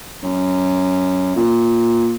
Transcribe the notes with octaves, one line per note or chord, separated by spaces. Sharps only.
F#2
A#2